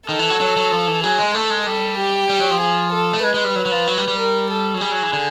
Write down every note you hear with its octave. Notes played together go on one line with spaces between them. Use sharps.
D#3 A4
E3
F#3
F#3
F#3
F3
E3
F#3 G#4
G#3
A3 A4
G#3
G3 A4
G4
G3
F#3
F3
G#4
A4
A3
G#3 B4
G#3
G3
F#3
F#3
F3
F#3
G3
G3
A#4
A4
F#3
G3 G#4
F#3
E3
D3